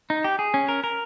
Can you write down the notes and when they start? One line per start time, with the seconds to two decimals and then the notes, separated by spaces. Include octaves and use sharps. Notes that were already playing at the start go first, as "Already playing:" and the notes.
0.10 D#4
0.24 G4
0.39 G#4
0.54 C#4
0.69 A#4
0.84 A#4